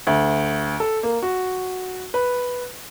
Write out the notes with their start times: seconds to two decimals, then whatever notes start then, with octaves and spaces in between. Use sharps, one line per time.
0.07 D2
0.80 A4
1.03 A#3
1.23 F#4
2.14 B4